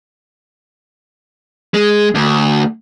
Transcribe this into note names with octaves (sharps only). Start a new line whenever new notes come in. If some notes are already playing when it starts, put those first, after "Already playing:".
G#3
D2